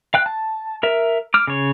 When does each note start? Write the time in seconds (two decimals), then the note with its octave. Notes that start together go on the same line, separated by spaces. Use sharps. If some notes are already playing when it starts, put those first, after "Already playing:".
0.14 F5 G5 F#6
0.26 A5
0.83 A#4 E5
1.34 D6 F6
1.47 C#3 C#5